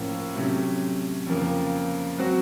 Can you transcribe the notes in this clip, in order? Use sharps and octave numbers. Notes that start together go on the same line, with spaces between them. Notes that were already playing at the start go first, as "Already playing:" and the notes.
Already playing: A2 F3 A#3 C#4
C3 F#3 A3 C#4
F2 C#3 F3 A#3
F#3 C4 F#4